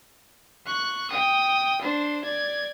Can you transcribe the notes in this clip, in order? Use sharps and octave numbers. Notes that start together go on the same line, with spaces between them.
C#6 F#6
G5 D#6
D4 C5
D5 G#6